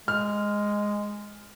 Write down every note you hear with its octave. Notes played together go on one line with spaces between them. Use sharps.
G#3 F6